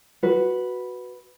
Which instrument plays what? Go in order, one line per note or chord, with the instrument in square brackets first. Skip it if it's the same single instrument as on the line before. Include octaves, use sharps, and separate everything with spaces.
[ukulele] F#4 B4